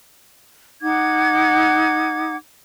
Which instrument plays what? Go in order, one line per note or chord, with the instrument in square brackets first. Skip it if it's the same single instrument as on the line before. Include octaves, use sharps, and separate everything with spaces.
[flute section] D#4 F#5 D6 G#6